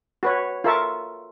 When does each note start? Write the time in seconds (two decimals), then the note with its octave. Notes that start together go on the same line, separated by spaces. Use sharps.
0.23 F#4 B4 C#5
0.64 F4 A4 A#4 E5 A5 C#6